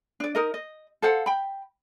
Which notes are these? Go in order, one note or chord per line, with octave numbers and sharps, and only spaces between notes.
D4 D5
D#4 A#4 D#5
D#5
A4 C5 F5 F#5
G5 B5